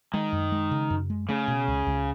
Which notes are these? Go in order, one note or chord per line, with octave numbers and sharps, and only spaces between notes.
D#3 G#3
F#2
G#3
C#3
F#2
G#3
C#3 A3
B2
C#2
C#2